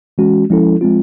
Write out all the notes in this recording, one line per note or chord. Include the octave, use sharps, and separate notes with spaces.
E3 G#3 C#4 F#4
F3 G#3 C#4 E4 A4
F3 G#3 C4 F4